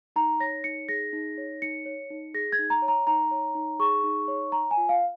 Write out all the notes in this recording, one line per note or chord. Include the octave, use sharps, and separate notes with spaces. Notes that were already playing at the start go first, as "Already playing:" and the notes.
D#4 A#5
C#5 A#6
D#4 C#7
G#4 A#6
D#4
C#5
D#4 C#7
C#5
D#4
G#4 A#6
G#6
D#4
A#5
C#5
A#5
D#4 A#5
C#5
D#4
G#4 C#6
D#4
C#5
C#5 A#5
G#5
F4
F5